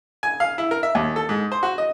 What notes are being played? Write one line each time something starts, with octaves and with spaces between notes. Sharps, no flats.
G#5
F5
E4
A#4
E5
D#2
A4
G#2
C5
F#4
D#5